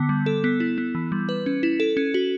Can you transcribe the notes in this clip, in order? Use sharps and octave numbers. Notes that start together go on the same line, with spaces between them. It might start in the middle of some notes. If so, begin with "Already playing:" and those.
Already playing: D3 B3
G3
A4
B3
E4
B3
E3
G3
B4
C#4
E4
A4
C#4
F#4